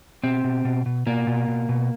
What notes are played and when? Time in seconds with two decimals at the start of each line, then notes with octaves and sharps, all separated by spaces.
0.23 B2 C4
0.44 B2
0.65 B2
0.86 B2
1.06 B2 A#3
1.27 B2
1.48 B2
1.69 B2